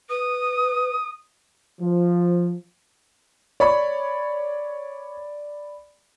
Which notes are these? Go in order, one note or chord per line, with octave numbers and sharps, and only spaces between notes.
B4 D#6
F3
C#5 D5 B5 C#6